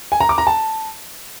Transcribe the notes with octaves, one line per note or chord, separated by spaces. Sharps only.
G#5
A#5
D6
A#5
A5